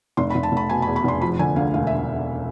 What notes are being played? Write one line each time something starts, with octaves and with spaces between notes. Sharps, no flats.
F1 C6
B5
F1
A5
F1 B5
B2 G#5
B5
E2
B5
F1 C6
F3 B5
D3 G#5
D2 F5
E1 F5
E5